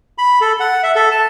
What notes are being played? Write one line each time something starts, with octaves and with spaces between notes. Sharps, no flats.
B5
A4
F#5
E5
A4
A5